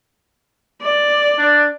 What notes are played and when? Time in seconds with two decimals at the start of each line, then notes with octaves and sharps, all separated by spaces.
0.81 D5
1.38 D4